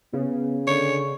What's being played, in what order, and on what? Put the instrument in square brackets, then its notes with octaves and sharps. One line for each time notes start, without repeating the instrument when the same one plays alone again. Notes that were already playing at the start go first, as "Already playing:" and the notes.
[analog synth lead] C#3 [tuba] B3
[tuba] D3 [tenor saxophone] C#5